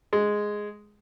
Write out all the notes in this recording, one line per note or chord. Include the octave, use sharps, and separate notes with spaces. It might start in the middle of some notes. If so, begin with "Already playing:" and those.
G#3